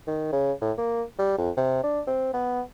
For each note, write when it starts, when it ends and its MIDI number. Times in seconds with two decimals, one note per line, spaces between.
0.07 0.31 51
0.32 0.52 49
0.61 0.72 45
0.78 1.02 58
1.19 1.34 55
1.38 1.50 41
1.57 1.83 48
1.84 2.01 62
2.07 2.30 60
2.34 2.61 59